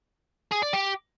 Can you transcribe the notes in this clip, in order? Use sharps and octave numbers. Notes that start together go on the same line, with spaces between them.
G#4
D5
G4